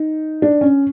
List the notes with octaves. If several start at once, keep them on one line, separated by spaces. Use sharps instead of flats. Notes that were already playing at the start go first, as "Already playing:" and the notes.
Already playing: D#4
D4
C#4